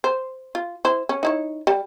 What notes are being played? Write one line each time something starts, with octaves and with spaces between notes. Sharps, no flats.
C5
F4
E4 C5
C#4
D#4 E4 C#5
G3